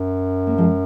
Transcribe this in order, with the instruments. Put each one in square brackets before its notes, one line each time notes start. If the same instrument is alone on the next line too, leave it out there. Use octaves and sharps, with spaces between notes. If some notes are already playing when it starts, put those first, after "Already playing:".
Already playing: [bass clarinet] F#2
[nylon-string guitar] A#3
F3 G#3